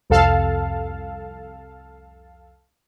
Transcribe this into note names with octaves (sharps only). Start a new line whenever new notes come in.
C2 F2 A4 F5 A5